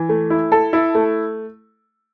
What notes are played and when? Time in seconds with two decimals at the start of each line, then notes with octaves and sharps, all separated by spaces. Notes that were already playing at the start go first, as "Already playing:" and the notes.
Already playing: E3
0.09 A3
0.30 E4
0.52 A4
0.73 E4
0.95 A3